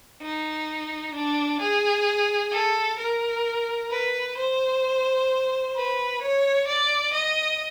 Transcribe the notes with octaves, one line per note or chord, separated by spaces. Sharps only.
D#4
D4
G#4
A4
A#4
B4
C5
B4
C#5
D5
D#5